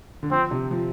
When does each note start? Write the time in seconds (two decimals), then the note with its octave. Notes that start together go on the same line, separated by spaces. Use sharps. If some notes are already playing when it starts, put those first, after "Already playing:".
0.23 D3
0.31 F3 C4
0.51 C3
0.71 F3